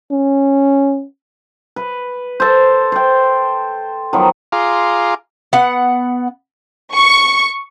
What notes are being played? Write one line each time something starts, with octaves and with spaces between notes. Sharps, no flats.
C#4
B4
A4 C5
C5 G5
D#3 F3 F#3 B3
F4 G#4 F5 A#5 C6 D6
B3 F#5
C#6